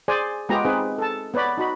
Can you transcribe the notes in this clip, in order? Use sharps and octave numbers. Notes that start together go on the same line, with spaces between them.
G#4 C5 D5 G#5
G#3 B3 F4 G4 G#4 A#5
C4 D#4 G#4 B4
A4 A5
B3 B4 C#5 D5 B5
D#4 F#4 B5